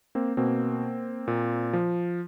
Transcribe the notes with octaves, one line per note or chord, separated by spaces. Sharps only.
A#3 C4
B2 A#3 C4
A#2
F3